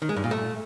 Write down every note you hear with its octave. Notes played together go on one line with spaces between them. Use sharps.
D#3
G#3
G2
A#2
A3